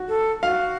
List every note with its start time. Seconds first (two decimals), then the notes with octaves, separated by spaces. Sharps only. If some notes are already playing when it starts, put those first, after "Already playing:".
Already playing: F#4
0.08 A4
0.43 F#4 F5